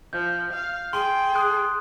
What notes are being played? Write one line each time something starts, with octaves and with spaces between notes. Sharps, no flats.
F3 G6
F5
G#4 G5 C6
C6 D#6 F#6